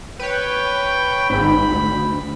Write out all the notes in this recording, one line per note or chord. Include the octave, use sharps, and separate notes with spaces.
B4 C#5 G5
G#1 G#2 B5
D2